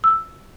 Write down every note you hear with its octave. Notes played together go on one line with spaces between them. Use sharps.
E6